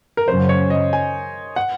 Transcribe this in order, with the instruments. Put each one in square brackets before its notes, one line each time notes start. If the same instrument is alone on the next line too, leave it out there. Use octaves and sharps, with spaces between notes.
[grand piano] A#4
[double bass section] F#2 C#3 F#3 C#4 [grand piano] C5
[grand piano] C#5
D#5
G#5
F#5